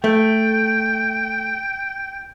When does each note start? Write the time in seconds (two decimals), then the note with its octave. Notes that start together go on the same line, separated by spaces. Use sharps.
0.04 A3 G5